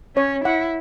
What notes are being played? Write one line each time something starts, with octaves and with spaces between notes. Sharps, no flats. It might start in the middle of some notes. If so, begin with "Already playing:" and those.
C#4 C#5
E4 F#5